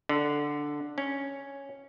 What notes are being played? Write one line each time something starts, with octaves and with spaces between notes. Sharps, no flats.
D3
C#4